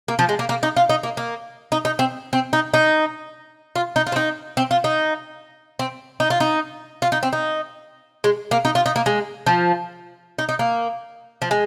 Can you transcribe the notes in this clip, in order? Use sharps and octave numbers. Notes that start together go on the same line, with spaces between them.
A#3
F3
G#3
A#3
A#3
D#4
F4
D#4
A#3
A#3
D#4
D#4
C4
C4
D#4
D#4
F4
D#4
F4
C4
D#4
C4
F4
D#4
C4
D#4
F4
D#4
F4
D#4
C4
D#4
G#3
A#3
D#4
F4
D#4
A#3
G#3
F3
D#4
D#4
A#3
F3
G#3